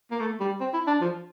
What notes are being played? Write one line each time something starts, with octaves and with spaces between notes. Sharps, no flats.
A#3
A3
G3
C4
E4
D4
F3